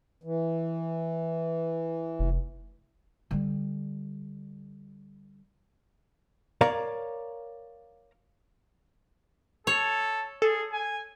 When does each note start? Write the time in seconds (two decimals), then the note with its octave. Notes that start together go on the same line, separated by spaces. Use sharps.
0.24 E3
2.19 F1
3.31 D3 G3
6.61 A#4 C#5 D5 F5 A#5
9.67 A4 C#5
10.42 G#4 A4
10.72 G#5